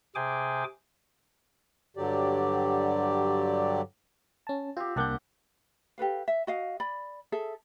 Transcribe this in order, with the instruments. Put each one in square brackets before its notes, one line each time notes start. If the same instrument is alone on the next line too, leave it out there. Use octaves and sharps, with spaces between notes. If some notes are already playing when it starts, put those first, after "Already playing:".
[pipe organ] C3 G#4 G5 G#5 D6
[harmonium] G2 D3 F#3 G4 D5
[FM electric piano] C#4 A5
[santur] C4 G4 [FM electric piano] F4
[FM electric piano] C2 A#3 G6 [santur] D4 G4 F#5
[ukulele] G4 A4 B4 F5
E5
F#4 D#5 F5
D5 B5
G#4 A4 E5